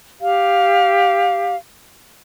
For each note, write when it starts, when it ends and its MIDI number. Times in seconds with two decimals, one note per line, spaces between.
0.20 1.55 67
0.20 1.55 77